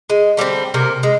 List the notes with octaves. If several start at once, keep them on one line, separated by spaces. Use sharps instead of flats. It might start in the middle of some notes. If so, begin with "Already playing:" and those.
G#3
D3 G3 A3 C4
C3 A#3 A#4
G#3